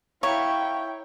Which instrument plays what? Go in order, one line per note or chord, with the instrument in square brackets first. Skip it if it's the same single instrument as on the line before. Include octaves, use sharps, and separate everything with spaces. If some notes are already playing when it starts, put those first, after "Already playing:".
[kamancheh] E4 G5 [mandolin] C#5 [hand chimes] F5 A#5 C#6